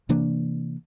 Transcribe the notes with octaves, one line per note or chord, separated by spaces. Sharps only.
C3 E3 A#3 D4